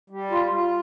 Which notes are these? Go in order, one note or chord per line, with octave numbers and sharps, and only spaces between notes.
G3
F4
F4